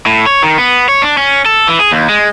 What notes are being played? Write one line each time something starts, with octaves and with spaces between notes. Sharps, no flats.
A2
C#5
D#3
B3
C#5
D4
C#4
A4
E3
G#4
D#2
G#3